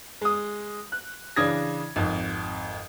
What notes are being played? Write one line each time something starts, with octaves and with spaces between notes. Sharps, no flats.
G#3 D#6
F#6
C#3 E3 D4 D#6 G#6 A#6
G#1 F2